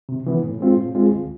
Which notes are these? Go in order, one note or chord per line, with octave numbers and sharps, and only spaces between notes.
C3
E3 B3
A2
G#3 C4 F4
A2
G#3 C4 F4
D2